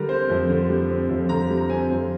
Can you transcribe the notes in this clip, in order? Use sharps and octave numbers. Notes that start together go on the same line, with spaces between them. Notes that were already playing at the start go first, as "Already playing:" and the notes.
Already playing: D3 G3 A#4
C4 C5
F2
D3
G3
C4
F2
D3 A#5
G3
A#5
C4 G#5
F2